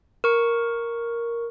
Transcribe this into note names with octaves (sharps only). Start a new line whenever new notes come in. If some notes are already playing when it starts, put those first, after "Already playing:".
A#4 C#6